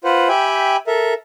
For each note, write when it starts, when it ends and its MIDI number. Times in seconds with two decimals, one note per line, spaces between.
0.04 0.28 65
0.04 0.28 71
0.04 0.28 72
0.04 0.28 78
0.29 0.77 67
0.29 0.77 76
0.29 0.77 79
0.29 0.77 80
0.29 0.77 83
0.87 1.14 69
0.87 1.14 70
0.87 1.14 76